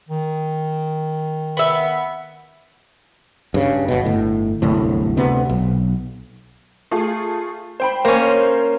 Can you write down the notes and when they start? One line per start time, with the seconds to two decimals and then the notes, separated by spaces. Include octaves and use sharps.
0.09 D#3
1.57 B3 E5
3.54 G2 C#3
3.88 G1 B2
4.05 G1 A2
4.62 D1 G1 C2 A2
5.17 D2 C3 B3
5.49 B1
6.91 A3 F4 G#4
7.80 C5 G5 B5
8.05 A#3 C#4 C5 C#5